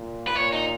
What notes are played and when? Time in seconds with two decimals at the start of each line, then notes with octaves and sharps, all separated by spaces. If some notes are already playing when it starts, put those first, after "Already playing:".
Already playing: A#2
0.28 B4
0.36 A#2 C#5
0.53 D#4